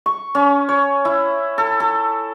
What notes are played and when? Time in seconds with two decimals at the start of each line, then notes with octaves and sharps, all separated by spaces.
0.06 C#6
0.35 C#4
0.69 C#5
1.05 E4
1.58 A4
1.80 A4